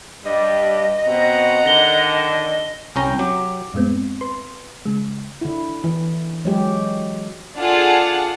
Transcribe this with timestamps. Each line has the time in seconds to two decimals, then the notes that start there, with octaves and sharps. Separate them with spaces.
0.25 G2 G3 D#5
1.07 B2 C4 F#5 A#5
1.66 D3 D#3 A#6 G7
2.96 C2 C#4 G5 A#5
3.19 F#3 G4
3.74 F#2 A2 G#3 B3 C4
4.21 B4 C6
4.85 C#3 G#3
5.41 D3 E4
5.84 E3
6.45 F#3 G#3 G4
7.59 D4 F4 G#4 A4 F#5